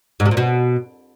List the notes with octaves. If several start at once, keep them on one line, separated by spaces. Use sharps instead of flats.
G#2
C3
A#2
B2